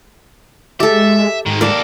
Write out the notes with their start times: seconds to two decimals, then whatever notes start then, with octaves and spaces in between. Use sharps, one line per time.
0.80 G#3 G4 A4 E5
1.46 G#2 D#3 G#3
1.61 D#2 A4 A#4 D5